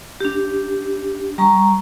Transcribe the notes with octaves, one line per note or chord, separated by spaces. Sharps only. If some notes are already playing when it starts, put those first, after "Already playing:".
D4 G4
G3 A#5 C#6